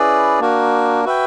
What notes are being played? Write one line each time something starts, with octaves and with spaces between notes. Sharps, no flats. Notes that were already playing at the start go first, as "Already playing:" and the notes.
Already playing: C#4 E4 G#4 B4 D5
A#3 D4 F#4 A#4
F#4 B4 E5 G5